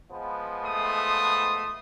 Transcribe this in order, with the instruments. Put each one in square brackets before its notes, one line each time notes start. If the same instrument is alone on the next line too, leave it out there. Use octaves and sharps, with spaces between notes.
[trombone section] F3 G#3 B3
[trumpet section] A3 C6 D#6